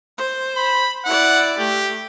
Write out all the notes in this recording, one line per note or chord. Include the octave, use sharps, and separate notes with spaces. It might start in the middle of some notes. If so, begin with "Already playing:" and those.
C5
B5
E4 D5 F#5
A3 G4